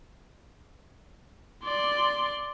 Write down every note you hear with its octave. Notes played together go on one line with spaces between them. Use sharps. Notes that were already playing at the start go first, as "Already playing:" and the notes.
D5 C6